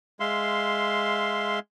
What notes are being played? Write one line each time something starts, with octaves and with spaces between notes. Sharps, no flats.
G#3 E5 F5 C6